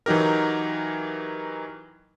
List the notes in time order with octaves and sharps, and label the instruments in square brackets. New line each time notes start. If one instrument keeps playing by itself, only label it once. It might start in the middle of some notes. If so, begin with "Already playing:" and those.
[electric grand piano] E3 F#3 D#4 G4 A#4